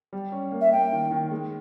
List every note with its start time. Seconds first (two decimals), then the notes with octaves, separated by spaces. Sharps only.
0.13 G3
0.32 C#4
0.52 A#3
0.61 E5
0.72 A#3 G5
0.92 D#3
1.11 D#3
1.31 G#3